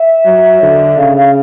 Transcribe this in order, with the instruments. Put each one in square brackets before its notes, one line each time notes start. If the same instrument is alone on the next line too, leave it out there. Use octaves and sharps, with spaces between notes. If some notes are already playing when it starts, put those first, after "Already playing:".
Already playing: [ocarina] E5
[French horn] F#3
D3
[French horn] C#3 [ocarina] F5
[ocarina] F5